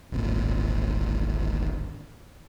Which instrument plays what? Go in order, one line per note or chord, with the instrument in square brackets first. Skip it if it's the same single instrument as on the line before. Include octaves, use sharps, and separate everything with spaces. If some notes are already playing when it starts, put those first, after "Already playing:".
[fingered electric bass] D1 G#1 A#2